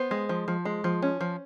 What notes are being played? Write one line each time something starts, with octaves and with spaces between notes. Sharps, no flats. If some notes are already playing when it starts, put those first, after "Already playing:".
Already playing: B3 C5
G#3
F3
F3
G#3
F3
C#4
F3